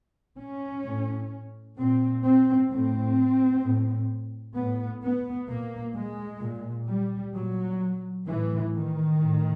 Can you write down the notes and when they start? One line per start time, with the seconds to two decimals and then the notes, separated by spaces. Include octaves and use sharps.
0.38 C#4
0.84 A2
1.77 A#2 C4
2.23 C4
2.69 A2 C4
3.62 A2
4.55 A2 B3
5.02 B3
5.48 A#2 A#3
5.94 G#3
6.41 A#2
6.88 G3
7.34 A#2 F#3
8.26 A2 E3
8.74 D#3
9.20 A2